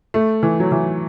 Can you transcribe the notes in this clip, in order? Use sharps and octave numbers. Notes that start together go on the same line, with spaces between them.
A3
E3
F#3
E3